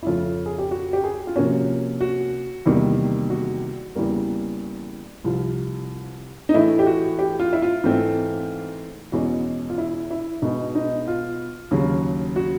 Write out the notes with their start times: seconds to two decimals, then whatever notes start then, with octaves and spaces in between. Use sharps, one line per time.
0.03 E4
0.06 F2 C#3 F3 A3 C#4 F4
0.46 G#4
0.58 G4
0.71 F#4
0.93 G4
1.04 G#4
1.27 F4
1.36 C3 F3 A#3 C#4 F#4
2.01 F#4
2.66 E2 C3 D#3 G3 A#3
3.30 F#4
3.95 E2 C#3 E3 G3 A#3
5.24 C2 C3 F3 F4
6.49 D#4
6.54 A2 E3 A3 E4
6.79 G4
6.86 F#4
7.19 G4
7.40 F4
7.53 E4
7.62 F4
7.84 G#2 E3 A3 C4
9.12 E2 B2 G#3 C#4 F#4
9.70 F4
9.78 E4
10.10 E4
10.42 B2 G#3 B3 D#4
10.75 D#4
11.08 F4
11.71 D#2 C#3 F#3
12.36 F#4